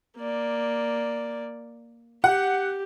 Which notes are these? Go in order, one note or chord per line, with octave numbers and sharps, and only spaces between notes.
A#3 D5
G4 F#5